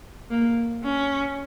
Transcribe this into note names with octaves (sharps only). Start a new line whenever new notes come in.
A#3
C#4